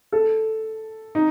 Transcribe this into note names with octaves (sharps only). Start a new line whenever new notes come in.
A4
D#4